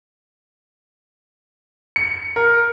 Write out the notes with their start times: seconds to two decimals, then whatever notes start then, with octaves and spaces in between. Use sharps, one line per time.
1.96 C#7
2.36 A#4